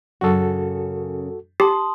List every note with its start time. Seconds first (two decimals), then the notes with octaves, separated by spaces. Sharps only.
0.21 F#2 C#3 F#4 A4
1.60 G4 A5 C6 D#6